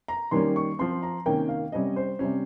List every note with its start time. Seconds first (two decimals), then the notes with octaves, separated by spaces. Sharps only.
0.08 A#5
0.31 D#3 G3 A#3 C#4 C6
0.56 C#6
0.79 F3 C4 C6
1.02 A#5
1.26 C3 D#3 A#3 C#4 G5
1.49 F5
1.72 C3 G3 C#4 D#5
1.96 C5
2.19 C3 G3 C#4